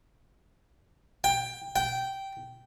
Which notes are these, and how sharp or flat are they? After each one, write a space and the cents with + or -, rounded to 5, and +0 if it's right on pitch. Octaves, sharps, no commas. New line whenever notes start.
G5 +15
G5 -10